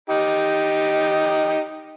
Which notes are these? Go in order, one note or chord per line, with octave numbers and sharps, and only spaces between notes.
D#4 G4